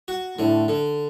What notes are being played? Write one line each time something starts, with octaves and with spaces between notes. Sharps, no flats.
F#4
A2 D3
D3